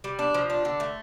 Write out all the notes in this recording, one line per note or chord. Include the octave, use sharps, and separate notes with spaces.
G3
D4
F3
D4
D3
A3